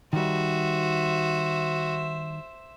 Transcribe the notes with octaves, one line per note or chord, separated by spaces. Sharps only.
D#3 G3 F#4 C5 E5